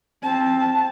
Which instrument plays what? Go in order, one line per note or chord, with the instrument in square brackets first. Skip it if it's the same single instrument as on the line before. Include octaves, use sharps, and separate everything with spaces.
[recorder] C4 [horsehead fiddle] A5